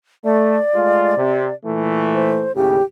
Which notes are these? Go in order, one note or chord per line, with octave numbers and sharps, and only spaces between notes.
A3 D5
G#3 A3 F4
C3
A#2 E3 A3
C5
D#2 A2 C#3 G4